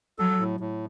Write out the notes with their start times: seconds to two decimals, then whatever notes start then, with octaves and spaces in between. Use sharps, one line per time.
0.19 F#3 A4
0.40 A2
0.60 A2